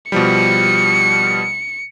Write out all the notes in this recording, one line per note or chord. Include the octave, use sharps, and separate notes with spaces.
B2 F3 G3 C#7